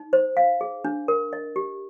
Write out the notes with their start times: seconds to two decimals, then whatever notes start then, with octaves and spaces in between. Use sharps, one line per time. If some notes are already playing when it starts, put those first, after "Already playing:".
Already playing: D#4
0.13 C5
0.37 F5
0.61 G#4
0.85 D4
1.08 A#4
1.33 D#5
1.56 G4